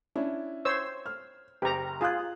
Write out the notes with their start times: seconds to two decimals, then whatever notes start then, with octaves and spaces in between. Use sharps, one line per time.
0.16 C#4 D4 E4
0.65 C5 C#5 E6
1.06 F6
1.62 F#1 G4 A#5
2.01 F4 G#4 D#6 F#6